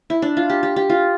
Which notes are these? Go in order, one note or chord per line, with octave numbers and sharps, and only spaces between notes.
E4
D4
F4
G4
G4
G4
F4